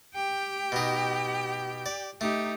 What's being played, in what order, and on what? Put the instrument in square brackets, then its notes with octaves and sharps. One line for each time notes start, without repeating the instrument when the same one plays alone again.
[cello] G4 G5
[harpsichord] B2 D#4
D5
[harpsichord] A3 [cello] D#4 G4